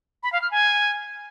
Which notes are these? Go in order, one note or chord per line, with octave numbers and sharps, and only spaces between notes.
B5
F5
F6
G#5